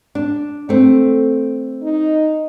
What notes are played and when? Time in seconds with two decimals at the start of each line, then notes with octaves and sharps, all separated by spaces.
0.15 D4
0.69 A3 C4
1.83 D#4